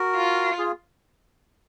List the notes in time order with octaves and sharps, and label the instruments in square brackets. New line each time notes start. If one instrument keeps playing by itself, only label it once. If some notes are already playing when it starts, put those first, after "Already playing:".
Already playing: [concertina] F#4 A#4
[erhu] F4
[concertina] F4 G#4